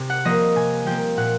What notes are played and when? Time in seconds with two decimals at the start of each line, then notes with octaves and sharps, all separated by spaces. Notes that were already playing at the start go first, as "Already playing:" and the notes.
Already playing: C3
0.10 F#5
0.24 F3 A#3 D#5
0.56 C3 G#5
0.86 F3 A#3 G5
1.17 A#2 F#5